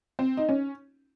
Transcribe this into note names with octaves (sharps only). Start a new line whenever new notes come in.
C4
D#4
C#4